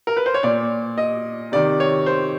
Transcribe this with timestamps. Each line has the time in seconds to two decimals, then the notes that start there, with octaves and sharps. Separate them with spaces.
0.07 A#4
0.17 B4
0.26 C5
0.34 C#5
0.43 A#2 D5
0.98 D#5
1.52 C3 D#3 D5
1.80 C#5
2.06 C5